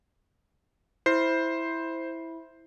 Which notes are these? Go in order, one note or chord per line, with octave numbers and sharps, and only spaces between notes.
E4 C5 C7